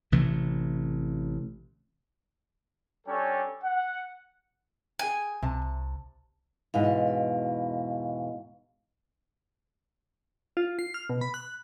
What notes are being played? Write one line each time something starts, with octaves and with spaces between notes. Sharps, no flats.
A1 C3 E3 A3
G3 C#4 D4 A4 C#5 G5
F#5
G#4 G5 G#5
C2 C3 A5
E2 G#2 B2 F5
F4
C7
F6
B2
B5
F#6